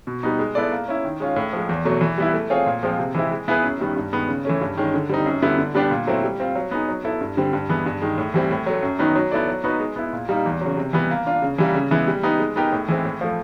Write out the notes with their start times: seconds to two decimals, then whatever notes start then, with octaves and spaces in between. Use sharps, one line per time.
0.07 B2
0.23 G3 B3 D#4
0.39 G#3
0.55 B3 E4 A4 D5
0.71 A#3
0.88 C#4 E4
1.04 D#3
1.20 G#3 C#4 F4
1.36 A2
1.53 F3 G#3
1.69 E2
1.85 B2 F#3 A3
2.01 E3
2.18 G3 B3 E4
2.34 A3
2.50 C4 F4 G#4 C#5
2.66 A#2
2.83 F3 G#3 C4 F4
2.99 C3
3.15 E3 G#3 C4 E4
3.31 G#3
3.48 B3 E4 G#4 B4
3.63 F#2
3.80 D#3 G3 B3
3.96 G2
4.13 D#3 G#3 B3
4.28 C#3
4.45 E3 A3 C#4
4.61 G2
4.77 D#3 G#3 C#4
4.94 D3
5.09 G3 C4 D#4
5.26 F#2
5.42 D3 G3 B3 E4
5.58 D3
5.75 G3 B3 D4 G4
5.91 A#2
6.07 F#3 A3 C4 E4
6.23 G3
6.40 C4 F4
6.55 F#3
6.71 B3 D#4 G#4
6.88 F#3
7.04 B3 E4 A4
7.21 G2
7.37 D3 G3 C4
7.53 G2
7.69 E3 G#3 B3
7.86 G2
8.02 D#3 G#3
8.18 A2
8.34 E3 G3 C4
8.51 A2
8.66 F#3 A3
8.83 F#2
8.99 D#3 F#3 B3 D#4
9.16 F#3
9.32 B3 E4 A4 D5
9.48 F#3
9.64 B3 D#4 F#4 B4
9.80 G#3
9.96 B3 E4
10.13 A#2
10.29 G3 A#3 D#4
10.46 E2
10.61 C#3 F#3
10.77 C3
10.93 E3 G3 B3
11.11 A#3
11.26 D4 F4
11.42 C#3
11.58 E3 G3 A#3
11.75 C#3
11.91 E3 G#3 B3 E4
12.07 G3
12.23 B3 D#4 G4
12.40 G#3
12.56 B3 D#4 G4 A#4
12.72 A2
12.88 E3 G#3 C4
13.05 A2
13.21 F3 A3